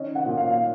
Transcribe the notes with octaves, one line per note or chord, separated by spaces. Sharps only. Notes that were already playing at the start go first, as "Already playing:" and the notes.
Already playing: D#3 C#4 D#5
F#5
A#2
F5
F5